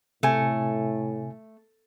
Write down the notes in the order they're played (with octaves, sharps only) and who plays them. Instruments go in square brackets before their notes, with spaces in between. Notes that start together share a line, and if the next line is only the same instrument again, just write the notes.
[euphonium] A2 [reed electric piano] C3 G#5 [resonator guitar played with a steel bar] A3